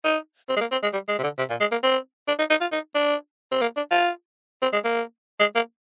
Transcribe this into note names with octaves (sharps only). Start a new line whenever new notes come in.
D#4
C4
G#3
A#3
C4
G#3
G3
G#3
C3
D3
C3
A#2
G#3
A#3
C4
D4
D#4
D#4
F4
D#4
D4
C4
A#3
D4
F4
C4
G#3
A#3
G#3
A#3